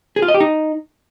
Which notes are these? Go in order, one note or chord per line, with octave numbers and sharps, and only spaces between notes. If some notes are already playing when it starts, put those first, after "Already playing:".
G#4
F4
D#5
G4
D#4